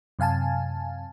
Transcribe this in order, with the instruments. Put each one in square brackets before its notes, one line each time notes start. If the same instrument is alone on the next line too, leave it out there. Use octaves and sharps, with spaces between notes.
[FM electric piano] F#2 C3 F5 G#5 A5